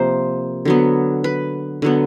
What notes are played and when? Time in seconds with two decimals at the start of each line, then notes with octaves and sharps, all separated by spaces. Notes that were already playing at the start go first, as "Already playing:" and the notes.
Already playing: C3 F3 A#3 C5
0.65 D3 F#3 B3
1.24 B4
1.82 D3 F#3 B3